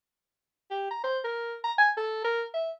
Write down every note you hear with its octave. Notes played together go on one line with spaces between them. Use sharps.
G4
A#5
C5
A#4
A#5
G#5
A4
A#4
E5